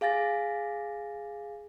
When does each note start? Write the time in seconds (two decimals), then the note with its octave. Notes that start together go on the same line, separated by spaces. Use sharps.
0.01 G#4 F5 G#5 A6 A#6